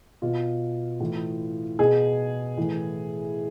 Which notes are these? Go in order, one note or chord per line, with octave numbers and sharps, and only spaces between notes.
B2 F4
A2 E3
B2 G#4
A2 E3